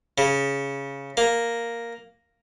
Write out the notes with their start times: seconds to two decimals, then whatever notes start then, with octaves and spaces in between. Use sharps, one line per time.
0.18 C#3
1.17 A#3